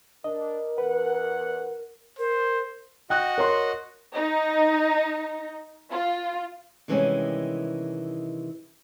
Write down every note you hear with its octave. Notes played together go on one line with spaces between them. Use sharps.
D4 A#4 D#5
E2 B4 F#5
A#4 C5
F#4 D#5 F#5 G5 F#6
A#4 C#5 C6
D#4
F4
C3 D#3 E3 G3 G#3 C#4